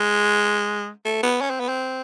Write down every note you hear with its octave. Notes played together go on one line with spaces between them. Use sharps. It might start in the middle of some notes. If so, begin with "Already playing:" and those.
Already playing: G#3
A3
B3
C#4
C4
B3
C4